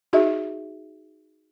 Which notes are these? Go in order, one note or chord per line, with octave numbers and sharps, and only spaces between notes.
D#4 F#4 G#4 D#5 E5